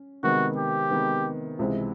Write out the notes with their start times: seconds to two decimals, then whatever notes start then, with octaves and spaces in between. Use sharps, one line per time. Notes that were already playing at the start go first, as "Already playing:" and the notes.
Already playing: C#4
0.23 C3 D#3 G#3 B3 F#4
0.57 G4
0.91 C3 D#3 G#3 B3
1.59 C#2 C3 E3 G#3